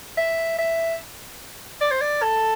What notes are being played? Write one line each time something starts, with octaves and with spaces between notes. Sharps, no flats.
E5
E5
D5
C5
D5
A4